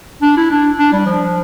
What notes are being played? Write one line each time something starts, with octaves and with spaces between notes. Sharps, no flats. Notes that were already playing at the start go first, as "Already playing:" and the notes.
D4
E4
D4
D4
G3
F3